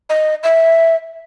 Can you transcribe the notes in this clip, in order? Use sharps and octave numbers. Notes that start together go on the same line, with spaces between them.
D#5
E5